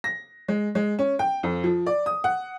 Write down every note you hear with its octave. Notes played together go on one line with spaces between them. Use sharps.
A#6
G#3
G#3
C#4
G5
F2
F3
D5
D#6
F#5